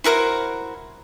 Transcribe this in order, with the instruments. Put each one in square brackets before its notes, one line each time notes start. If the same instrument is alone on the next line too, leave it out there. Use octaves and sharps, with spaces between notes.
[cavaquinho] E4 F#4 A#4 C5